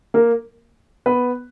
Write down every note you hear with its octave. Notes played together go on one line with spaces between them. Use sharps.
A#3 A#4
B3 B4